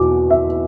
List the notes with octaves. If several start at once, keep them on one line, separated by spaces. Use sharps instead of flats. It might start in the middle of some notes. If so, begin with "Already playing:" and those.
Already playing: E2 B2 F#3 D6
E5